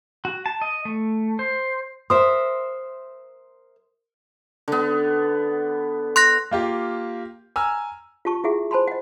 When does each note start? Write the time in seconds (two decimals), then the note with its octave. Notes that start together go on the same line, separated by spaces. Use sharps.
0.25 F#4
0.46 A5
0.62 D#5
0.85 A3
1.39 C5
2.10 A#4 C5 E5 C6 D#6
4.68 D3 B3
6.16 C6 F#6 A#6
6.51 A#3 F4 G4
7.56 G#5 A#5 E6 F6
8.25 F4 G4 A5 C#6
8.44 E4 F4 G4 G#4 E5 F#5
8.71 C5 G#5 A5 B5 C6
8.87 D#5 F#5